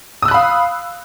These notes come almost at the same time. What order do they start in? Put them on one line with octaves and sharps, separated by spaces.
D#6 E6 F#6 B5 F5